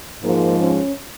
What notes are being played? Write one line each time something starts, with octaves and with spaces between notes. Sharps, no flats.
G#2 F3 G#3 A#3
C#4